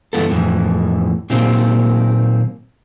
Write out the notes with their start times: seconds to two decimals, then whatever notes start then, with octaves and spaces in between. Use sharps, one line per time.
0.13 G2 C#3 E3 B3 A4
0.30 F2 A2 E3
1.30 A#2 D#3 F#3 A#3 C4